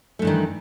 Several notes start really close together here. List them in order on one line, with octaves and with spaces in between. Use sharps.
A3 G2 E3 D#3